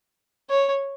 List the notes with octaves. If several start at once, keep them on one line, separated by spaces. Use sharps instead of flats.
C#5